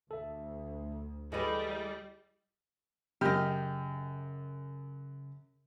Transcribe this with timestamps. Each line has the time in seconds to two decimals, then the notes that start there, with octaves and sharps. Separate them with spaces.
0.11 D2 A4 E5
1.32 E3 G3 A3 E4 G#4 B4 D#5
3.21 F#2 C#3 G4 D#5 F6